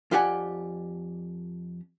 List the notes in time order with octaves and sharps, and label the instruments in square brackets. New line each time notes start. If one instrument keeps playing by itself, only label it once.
[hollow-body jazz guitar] F2 F4 G4 D5 F#5 G#5